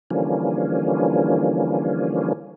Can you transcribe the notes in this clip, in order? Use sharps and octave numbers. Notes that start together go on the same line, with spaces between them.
D3 E3 F3 G3 A#3 C#4